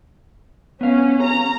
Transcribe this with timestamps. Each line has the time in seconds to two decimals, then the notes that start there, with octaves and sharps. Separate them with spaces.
0.81 B3 C#4 F5
1.25 A#5